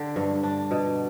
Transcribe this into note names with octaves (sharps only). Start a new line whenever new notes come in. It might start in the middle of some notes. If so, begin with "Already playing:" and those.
Already playing: D3 D4 G4
G2
D4
B2